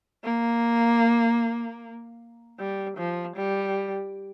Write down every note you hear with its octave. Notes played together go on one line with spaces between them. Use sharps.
A#3
G3
F3
G3